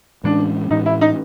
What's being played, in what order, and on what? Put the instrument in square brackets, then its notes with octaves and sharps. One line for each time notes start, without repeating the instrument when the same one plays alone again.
[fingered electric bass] A2 E3 G#3 C#4 [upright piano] D4
[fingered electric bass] A2 E3 G#3 C#4 [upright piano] D#4
[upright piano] E4
D#4